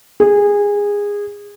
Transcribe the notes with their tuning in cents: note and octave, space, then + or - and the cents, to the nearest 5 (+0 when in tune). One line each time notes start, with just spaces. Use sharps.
G#4 -20